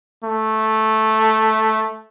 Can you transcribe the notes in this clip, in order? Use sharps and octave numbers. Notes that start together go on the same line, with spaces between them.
A3